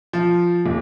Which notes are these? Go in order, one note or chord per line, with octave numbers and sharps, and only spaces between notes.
F3
D#1